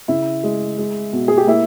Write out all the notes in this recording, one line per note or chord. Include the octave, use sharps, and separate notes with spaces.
C#3 E4
G#3
G#3
B2
G#4
G4
A#3 E4